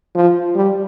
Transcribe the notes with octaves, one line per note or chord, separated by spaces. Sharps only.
F3
G3